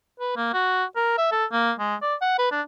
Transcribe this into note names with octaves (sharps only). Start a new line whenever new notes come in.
B4
A#3
F#4
A#4
E5
A4
A#3
G#3
D5
F#5
B4
D4